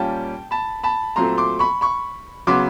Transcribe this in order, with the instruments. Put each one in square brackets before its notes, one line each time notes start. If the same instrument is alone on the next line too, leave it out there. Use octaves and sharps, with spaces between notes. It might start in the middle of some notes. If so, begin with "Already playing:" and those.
Already playing: [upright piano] A#2 G3 A#3 C#4 G5 A5
A5 B5
A5 B5
A#2 F#3 A3 C4 A#5 C6
C6 D6
B5 C#6
B5 C#6
C#3 F#3 B3 C6 D6